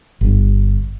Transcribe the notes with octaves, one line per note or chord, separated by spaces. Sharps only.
G1